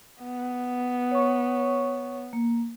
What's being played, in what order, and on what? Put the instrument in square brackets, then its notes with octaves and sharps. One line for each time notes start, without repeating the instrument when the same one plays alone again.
[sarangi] B3
[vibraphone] C#5 C#6
A#3